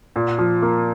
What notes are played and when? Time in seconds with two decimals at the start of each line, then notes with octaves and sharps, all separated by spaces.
0.16 A#2
0.39 F3
0.62 A#3